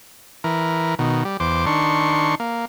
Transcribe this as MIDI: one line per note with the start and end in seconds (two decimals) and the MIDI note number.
0.44 0.95 52
0.44 0.95 70
0.99 1.24 47
0.99 1.24 51
1.25 1.37 55
1.40 1.65 40
1.40 1.65 72
1.40 1.65 86
1.66 2.35 51
1.66 2.35 62
1.66 2.35 84
1.66 2.35 85
2.40 2.65 58